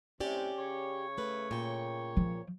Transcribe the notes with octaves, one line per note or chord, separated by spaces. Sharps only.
A2 C3 C#4 G4 D5
C#3 C#5
A3 B4
A#2 G5
F3